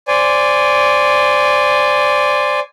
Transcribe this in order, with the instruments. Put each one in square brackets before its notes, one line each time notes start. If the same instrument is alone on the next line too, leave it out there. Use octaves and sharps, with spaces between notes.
[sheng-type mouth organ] C5 D5 G#5